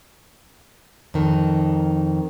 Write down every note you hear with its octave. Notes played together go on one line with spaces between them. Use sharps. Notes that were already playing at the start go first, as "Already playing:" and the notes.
F2 D#3